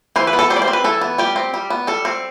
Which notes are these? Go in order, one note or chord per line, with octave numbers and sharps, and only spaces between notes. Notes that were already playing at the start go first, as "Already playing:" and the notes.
E3 C5
B4
B3
A4
G3 C5
D5
C5
C4
B4
E3 A4
B3
G3 G4
C4
G3
B3
G3 A4
C4